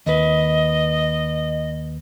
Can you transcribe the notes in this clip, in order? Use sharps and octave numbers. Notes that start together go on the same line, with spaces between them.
D#2 B4 D#5